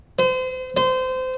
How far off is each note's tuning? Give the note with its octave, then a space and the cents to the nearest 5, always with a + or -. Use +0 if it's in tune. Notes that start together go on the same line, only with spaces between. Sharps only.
C5 -35
C5 -25